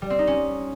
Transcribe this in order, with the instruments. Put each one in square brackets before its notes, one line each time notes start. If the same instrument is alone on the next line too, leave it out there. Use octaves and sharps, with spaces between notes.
[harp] G3
C4
D#4
C#4